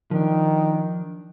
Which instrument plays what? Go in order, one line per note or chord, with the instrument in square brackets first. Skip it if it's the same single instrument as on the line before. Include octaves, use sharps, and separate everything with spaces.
[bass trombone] D#3 [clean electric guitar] F3 D4